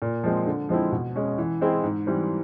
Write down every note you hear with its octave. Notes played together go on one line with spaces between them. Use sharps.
A#2
F3 G#3 C4
D3
F3 G#3 C4 E4
B2
G#3 C#4
E3
G#3 C4 E4 G#4
G#2
E3 G3 C4